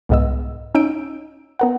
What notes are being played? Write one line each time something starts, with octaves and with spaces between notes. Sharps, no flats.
C2 G#2 G#3 B3 D#5 E6
C#4 D#4 E6 G6 D7
B3 A#4 F#5